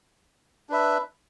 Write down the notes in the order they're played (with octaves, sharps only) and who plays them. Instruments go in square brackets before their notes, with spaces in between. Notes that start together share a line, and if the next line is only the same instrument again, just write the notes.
[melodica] D4 B4 E5